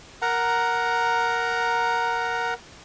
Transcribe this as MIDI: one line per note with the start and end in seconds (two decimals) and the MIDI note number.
0.22 2.54 70
0.22 2.54 78
0.22 2.54 82